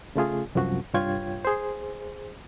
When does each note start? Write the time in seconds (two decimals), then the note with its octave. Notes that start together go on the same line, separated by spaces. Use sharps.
0.15 C#3 A3 F4 G#4
0.55 C2 F#2 F3 F#4
0.94 C2 G2 F4 C#5 G5 G#6
1.45 G#4 C5